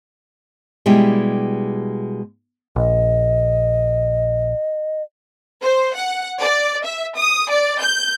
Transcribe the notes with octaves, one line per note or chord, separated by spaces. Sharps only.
B2 G3 G#3 E4 G4
A#1 D#5
C5
F#5
D5
E5
D#6
D5
G6